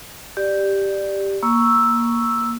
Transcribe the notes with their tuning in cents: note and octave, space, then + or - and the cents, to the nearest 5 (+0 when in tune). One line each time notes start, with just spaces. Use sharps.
G4 +0 D5 +10
A#3 +10 C#6 +0 E6 +0